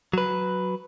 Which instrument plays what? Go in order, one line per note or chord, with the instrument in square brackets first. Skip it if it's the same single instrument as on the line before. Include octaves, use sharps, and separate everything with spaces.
[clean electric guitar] F#3 B4